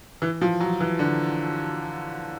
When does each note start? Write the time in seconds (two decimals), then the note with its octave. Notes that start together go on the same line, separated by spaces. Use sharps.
0.22 E3
0.41 F3
0.60 F#3
0.80 E3
0.99 D3